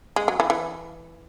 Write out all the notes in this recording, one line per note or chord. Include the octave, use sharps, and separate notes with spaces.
G#3
F#3
E3
E3